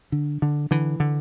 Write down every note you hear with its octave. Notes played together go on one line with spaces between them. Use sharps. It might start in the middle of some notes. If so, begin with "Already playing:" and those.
D3
D3
D3 E3
D3